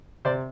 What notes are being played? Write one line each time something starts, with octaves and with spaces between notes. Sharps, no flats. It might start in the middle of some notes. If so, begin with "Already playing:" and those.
C3 C5 D5